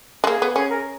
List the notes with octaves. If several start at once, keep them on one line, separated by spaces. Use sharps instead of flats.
G#3
A#3 G#4
B3
C#4 G#4
A#4